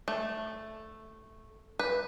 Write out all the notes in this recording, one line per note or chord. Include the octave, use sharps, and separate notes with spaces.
A3
B4